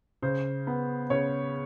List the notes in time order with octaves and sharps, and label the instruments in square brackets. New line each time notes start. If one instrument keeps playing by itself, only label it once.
[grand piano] C#3 C5
B3
C#3 C#5